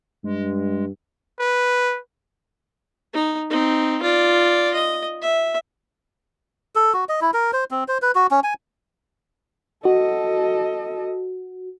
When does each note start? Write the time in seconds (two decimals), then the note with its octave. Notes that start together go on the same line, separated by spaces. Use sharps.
0.24 G2 G#3
1.40 B4
3.14 D#4
3.50 C4 D#4
4.02 F4 D5
4.75 D#5
5.22 E5
6.75 A4
6.94 F#4
7.09 D#5
7.21 E4
7.34 A#4
7.53 C5
7.71 C4
7.88 C5
8.02 B4
8.15 F#4
8.31 C#4
8.44 G#5
9.85 F#4 A4 D#5